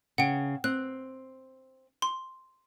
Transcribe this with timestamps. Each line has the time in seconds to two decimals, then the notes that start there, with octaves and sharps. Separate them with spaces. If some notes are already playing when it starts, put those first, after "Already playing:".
0.18 C#3 F#5 G5
0.64 C4 F#6
2.02 C6